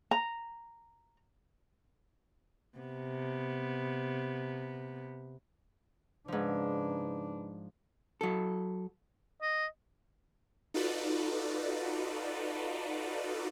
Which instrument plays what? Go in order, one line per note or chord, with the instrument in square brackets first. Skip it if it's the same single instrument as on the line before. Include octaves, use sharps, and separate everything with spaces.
[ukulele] A#5
[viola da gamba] C3 B3
[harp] G#2 F3 [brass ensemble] C#3 D#4 B4 [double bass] D4
[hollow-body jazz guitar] F#3 A4
[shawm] D#5
[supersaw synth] D#4 F4 F#4 A4 B4 D5